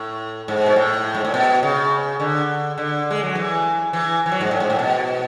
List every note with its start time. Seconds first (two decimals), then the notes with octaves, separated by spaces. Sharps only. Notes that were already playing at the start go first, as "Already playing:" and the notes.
Already playing: A2
0.48 G#2
0.66 B2
0.76 A2
1.14 G#2
1.25 A2
1.34 B2
1.63 C#3
2.20 D3
2.78 D3
3.11 G#3
3.23 F#3
3.35 E3
3.93 E3
4.26 E3
4.32 F#3
4.41 G#2
4.51 A2
4.60 G#2
4.70 A2
4.79 B2